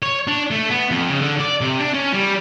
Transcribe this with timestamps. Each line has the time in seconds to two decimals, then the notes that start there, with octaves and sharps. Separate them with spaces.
0.03 C#5
0.27 D4
0.51 A3
0.70 B3
0.91 F2
1.09 C#3
1.21 D3
1.40 D5
1.61 C3
1.79 D4
1.94 C#4
2.14 G3